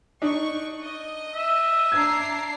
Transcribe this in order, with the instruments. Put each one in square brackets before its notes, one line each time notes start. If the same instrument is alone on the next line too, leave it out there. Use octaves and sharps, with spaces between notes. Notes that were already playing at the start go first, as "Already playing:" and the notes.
[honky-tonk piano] D4 D#4 [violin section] C#6
[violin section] D#5
[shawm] E5
[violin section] D4 A#5 C7 [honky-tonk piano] G#6